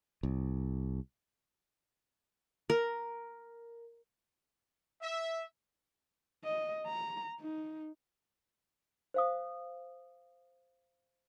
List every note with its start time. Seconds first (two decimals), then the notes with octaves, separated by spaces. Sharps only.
0.23 C2
2.70 A#4
5.02 E5
6.44 D#5
6.86 A#5
7.40 D#4
9.14 C5 F5 D#6